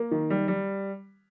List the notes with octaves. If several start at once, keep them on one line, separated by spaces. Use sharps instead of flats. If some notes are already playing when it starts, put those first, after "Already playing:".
Already playing: A#3
D#3
G3
G3